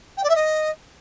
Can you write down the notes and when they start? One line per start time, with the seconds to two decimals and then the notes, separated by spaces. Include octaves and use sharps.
0.17 G5
0.23 D5
0.29 E5
0.35 D#5